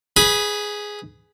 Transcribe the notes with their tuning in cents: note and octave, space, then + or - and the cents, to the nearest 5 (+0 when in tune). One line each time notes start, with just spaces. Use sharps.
G#4 +0 B4 +20 B5 -15